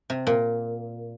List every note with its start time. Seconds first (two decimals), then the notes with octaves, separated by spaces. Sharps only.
0.10 C3
0.27 A#2